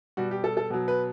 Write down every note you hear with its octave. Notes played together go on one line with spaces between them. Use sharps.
B2 G3 F#4
G4
A4
A4
B2 F#3
B4